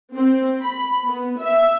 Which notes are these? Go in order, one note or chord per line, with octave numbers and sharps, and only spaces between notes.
C4
B5
B3
E5